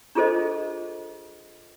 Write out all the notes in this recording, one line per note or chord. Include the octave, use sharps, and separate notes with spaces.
D4 F4 G#4 A4 C5 D#5